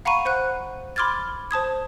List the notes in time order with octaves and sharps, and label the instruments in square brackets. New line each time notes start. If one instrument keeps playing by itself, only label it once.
[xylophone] F5 F#5 A#5 B5 C#6 D#7
C5 F#5 F#6
B5 C6 D6 F6 G#6 A6
C5 A5 D#6 G#6